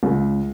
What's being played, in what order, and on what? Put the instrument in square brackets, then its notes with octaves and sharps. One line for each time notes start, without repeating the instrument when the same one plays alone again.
[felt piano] C#2